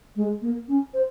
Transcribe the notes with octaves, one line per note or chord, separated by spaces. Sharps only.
G#3
A#3
C#4
C5